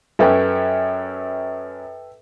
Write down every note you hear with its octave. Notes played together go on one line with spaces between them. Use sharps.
F#2 C#4 A4 B4 C#5 G5